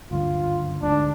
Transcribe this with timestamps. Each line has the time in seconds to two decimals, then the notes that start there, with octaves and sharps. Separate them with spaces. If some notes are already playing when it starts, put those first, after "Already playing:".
0.11 F#1 D2 G2 F4
0.82 D2 G#2 D4